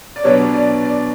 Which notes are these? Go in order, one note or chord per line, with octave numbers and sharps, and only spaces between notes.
D5
B2 F#3 B3 D4 C#5
D5
D5